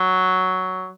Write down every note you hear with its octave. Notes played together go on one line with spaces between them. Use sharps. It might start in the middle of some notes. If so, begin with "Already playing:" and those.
Already playing: F#3